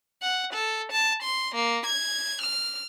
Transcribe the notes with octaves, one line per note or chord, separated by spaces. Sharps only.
F#5
A4
A5
C6
A#3
G#6
F6